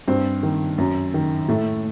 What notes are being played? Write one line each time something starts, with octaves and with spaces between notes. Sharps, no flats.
G2 C4
D#3
F#2
D#3
A2 A3